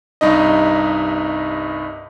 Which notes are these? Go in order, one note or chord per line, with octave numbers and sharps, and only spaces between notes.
C2 G2 D#4 D#5